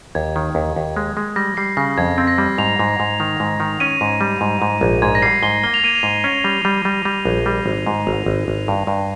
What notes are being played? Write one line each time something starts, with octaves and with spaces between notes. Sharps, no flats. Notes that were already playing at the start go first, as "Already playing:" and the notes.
D#2 G#6
D#3
D#2
D#2
G#3
G#3
G3 A#6
G3 C7
C#3 A#6
F2 G#6
C4
A#6
G3
G#2 F7
G#2
G#2
D#3
G#2
D#3
C#4 D#7
G#2
G3
G#2
G#2
A#1
G#2 G#6
A#6
G3 C7
G#2 G7
A#3 G7
F7
A#3 D#7
F7
G#2
C#4
G3
G3
G3
G3
A#1
G3
G#1
G#2
G#1 F7
G#1
G#1
G2
G2